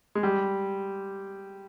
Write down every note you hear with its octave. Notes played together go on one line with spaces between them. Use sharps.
G#3
G3